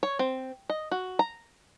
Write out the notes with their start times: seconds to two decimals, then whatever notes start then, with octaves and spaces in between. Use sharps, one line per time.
0.03 C#5
0.19 C4
0.70 D#5
0.91 F#4
1.19 A#5